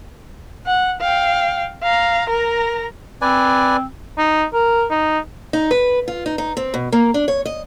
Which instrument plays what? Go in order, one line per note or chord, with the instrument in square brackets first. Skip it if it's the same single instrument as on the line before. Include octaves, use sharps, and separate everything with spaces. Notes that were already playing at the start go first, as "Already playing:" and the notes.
[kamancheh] F#5
F5 G5
F5 A#5
A#4 A#5
[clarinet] C4 [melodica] B4 D5 G#5
[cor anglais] D#4
A#4
D#4
[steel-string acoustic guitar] D#4
B4
F4
D#4
D#4
C4
B2
A#3
D4
C#5
D#5